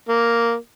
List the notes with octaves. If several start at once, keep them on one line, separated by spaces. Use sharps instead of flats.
A#3